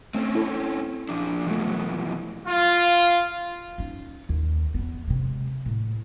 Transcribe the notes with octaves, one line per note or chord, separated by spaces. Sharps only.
A3 C4 C#4
E4 A4
A#2 F3 D4
F#2 B2 E3 F3 A3
F4
C#4 D#4
D#2
E2 B3
C3 G#3
A2